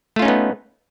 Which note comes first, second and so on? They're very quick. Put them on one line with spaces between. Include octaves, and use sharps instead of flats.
A3 F4 C#4 D#4 B3